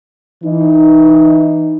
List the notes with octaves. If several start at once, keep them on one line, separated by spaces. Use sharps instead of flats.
E3 D#4